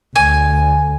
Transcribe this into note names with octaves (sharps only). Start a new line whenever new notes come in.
D2 G#5